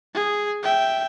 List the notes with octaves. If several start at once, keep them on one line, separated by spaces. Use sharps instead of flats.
G#4
E5 G5